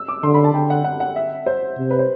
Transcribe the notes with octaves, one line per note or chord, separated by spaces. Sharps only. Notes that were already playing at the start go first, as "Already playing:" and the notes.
Already playing: E6
D6
D3 C6
B5
A5
D3 G5
F#5
F#5
F#5
E5
C5
C3
B4
C5